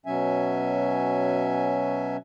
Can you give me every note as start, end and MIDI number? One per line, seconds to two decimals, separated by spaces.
0.06 2.17 47
0.06 2.17 54
0.06 2.17 61
0.06 2.17 76
0.06 2.17 80